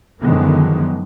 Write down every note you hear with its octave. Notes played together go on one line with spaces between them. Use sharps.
F#2 D3 D#3 F3 G#3 B3